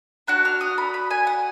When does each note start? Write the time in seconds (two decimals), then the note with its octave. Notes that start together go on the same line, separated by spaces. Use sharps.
0.27 D4 F#4 F#6
0.45 F6
0.61 D#6
0.78 B5
0.94 B5
1.11 G#5
1.27 F#5